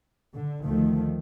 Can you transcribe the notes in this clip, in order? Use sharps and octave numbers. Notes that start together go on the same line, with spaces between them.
D3
D2 D#3 F3 A3